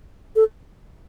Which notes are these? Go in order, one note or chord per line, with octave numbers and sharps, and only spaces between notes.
A4